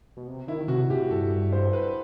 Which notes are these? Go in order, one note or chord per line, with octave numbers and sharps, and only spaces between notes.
B2
C3
D#3 E4
C3 F#4
A2 G4
G2 A4
C5
B4